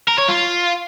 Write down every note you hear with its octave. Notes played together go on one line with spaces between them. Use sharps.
A#4
C#5
F4